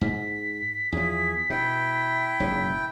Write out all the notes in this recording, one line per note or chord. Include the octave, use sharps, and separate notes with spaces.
G#2 B6
E2 F3 G#4
B2 E4 G5
F#1 G#2 B2